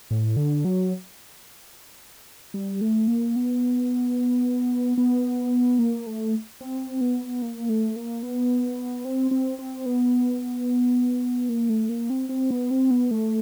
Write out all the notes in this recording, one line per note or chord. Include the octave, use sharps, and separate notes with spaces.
A2
D3
F#3
G3
A3
A#3
B3
B3
A#3
A3
C4
B3
A#3
A3
A#3
B3
C4
C4
C4
B3
A#3
A3
A#3
C4
C4
B3
C4
B3
A3